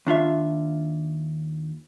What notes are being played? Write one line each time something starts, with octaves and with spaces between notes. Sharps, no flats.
D#2 D4 F4 E5